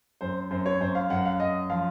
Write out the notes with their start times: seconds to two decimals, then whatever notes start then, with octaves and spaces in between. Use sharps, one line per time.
0.21 F#2 C5
0.51 F#2 C5
0.66 C#5
0.81 F#2 C5
0.95 F5
1.10 F#2 F#5
1.25 F5
1.40 F#2 D#5
1.70 F3 F5